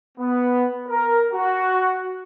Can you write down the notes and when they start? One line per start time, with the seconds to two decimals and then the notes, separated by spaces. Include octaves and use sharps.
0.18 B3
0.88 A#4
1.32 F#4